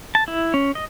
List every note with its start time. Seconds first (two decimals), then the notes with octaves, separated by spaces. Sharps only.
0.15 A5
0.28 E4
0.54 C#4
0.75 D#5